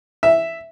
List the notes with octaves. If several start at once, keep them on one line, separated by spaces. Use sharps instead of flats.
E5